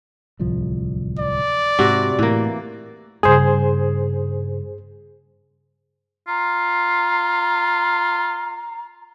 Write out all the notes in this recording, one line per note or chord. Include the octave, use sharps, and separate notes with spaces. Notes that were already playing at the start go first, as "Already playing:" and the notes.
D1 C2 F3
D5
G#2 C3 F#4
A2 E3 A#3
G2 C#3 G#4 C5
F4 A#5